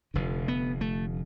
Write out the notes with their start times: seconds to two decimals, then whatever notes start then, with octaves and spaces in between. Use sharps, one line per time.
0.14 F1 F2 D3
0.48 B3
0.81 A3